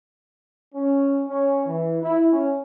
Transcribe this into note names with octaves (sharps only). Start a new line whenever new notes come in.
C#4
C#4
E3
E4
C#4